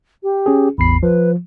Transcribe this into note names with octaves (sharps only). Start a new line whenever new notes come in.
G4
C#4 G#4
A1 E2 B5 C7
F3 B4